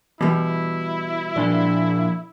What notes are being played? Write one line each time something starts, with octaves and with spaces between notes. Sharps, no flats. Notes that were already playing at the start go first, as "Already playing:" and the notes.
B2 E3 G3 E4
A#2 F3 D4 D5